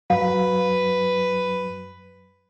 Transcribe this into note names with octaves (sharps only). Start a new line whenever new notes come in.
F#2 F#3 B4 F5